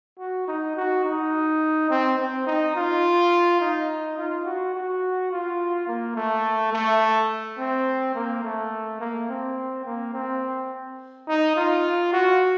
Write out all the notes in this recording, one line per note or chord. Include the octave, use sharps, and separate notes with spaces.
F#4
D#4
F#4
D#4
C4
C4
D#4
F4
D#4
F4
F#4
F#4
F4
A#3
A3
A3
C4
A#3
A3
A#3
C4
A#3
C4
D#4
F4
F#4